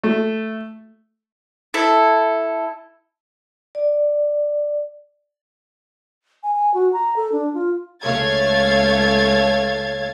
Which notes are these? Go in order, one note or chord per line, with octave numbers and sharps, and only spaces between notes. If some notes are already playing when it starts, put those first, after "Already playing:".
A3
E4 A4
D5
G#5
G#5
F#4
A#5
A4
D4
F4
C#2 A3 C#5 F5 G#6 A6